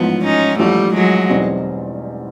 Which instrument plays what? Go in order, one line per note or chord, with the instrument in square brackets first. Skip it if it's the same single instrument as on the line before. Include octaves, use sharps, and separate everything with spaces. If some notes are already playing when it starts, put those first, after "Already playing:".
Already playing: [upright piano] A1 G#2 F3 [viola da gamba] B3
[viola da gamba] C#4 D#4
[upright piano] A1 G#2 F3 [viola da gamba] G3 A3
[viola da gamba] F#3 G#3
[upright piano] E2 B2 G3 C4 D#4